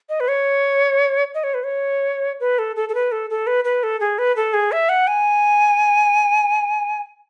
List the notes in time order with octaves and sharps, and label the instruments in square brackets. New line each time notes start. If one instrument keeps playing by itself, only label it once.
[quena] D#5
B4
C#5
D#5
C#5
B4
C#5
B4
A4
A4
A4
B4
A4
A4
B4
B4
A4
G#4
B4
A4
G#4
E5
F#5
G#5